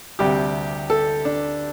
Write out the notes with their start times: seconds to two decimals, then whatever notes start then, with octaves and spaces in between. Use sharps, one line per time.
0.19 D2 C3 G3 G4
0.90 A4
1.25 D4